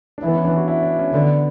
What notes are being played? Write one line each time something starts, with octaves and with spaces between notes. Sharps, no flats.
D4
E3 E4
B3
C#4
D4
F#4
E4
D4
C#4
D3 B3